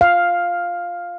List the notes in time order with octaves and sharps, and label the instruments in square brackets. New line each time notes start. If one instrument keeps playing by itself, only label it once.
[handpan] F5